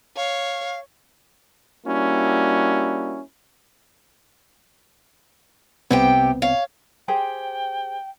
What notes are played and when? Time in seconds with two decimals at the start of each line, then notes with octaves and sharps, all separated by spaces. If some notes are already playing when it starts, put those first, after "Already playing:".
0.17 C#5 F5
1.86 G3 A#3 C#4 D4 E4 F#4
5.91 C2 C3 B3 C4 G4 G5
6.42 C#5 F5
7.08 G4 G#4 C5 G5